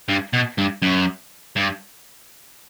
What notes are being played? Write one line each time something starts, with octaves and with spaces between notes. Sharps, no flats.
G2
B2
G2
F#2
G2